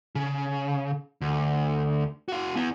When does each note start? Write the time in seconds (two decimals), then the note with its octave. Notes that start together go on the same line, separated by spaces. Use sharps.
0.15 C#3
1.21 D2
2.28 F#4 F5
2.56 B3 E4